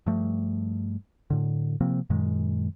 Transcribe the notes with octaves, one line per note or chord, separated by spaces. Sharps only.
G2 F3 A3
A2 D3
C3 F3 A#3 C4
F#2 A#2 D#3 G#3